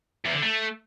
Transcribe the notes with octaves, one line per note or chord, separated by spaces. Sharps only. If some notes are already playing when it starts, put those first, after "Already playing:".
E2
D3
A3